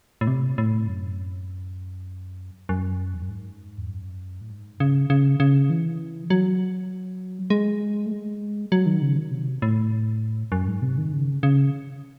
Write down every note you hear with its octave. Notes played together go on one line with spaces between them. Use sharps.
A2
C3
A2
F#2
F#2
E2
F#2
G#2
E2
F#2
A2
G#2
C#3
C#3
C#3
E3
F#3
G#3
A3
G#3
F#3
D#3
C#3
D#3
C3
A2
F#2
G#2
C3
D#3
C#3
C#3